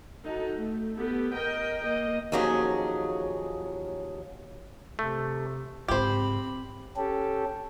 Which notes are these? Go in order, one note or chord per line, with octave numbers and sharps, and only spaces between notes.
D#4 F#4 A4
A3
B3 G4 A4
A#4 D#5 G5
A#3 D#5
D#2 F3 F#3 C#4 G#4
C3 A3
G#2 C#3 C4 G4 C5 B5
C#4 G4 A4